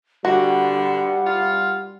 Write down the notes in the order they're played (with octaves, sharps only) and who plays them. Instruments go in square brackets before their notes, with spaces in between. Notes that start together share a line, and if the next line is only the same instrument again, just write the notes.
[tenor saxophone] D3 [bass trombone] G3 [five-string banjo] F#4 [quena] F#5
[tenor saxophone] F4